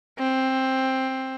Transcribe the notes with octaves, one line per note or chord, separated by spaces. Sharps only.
C4